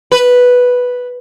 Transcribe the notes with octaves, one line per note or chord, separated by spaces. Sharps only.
B4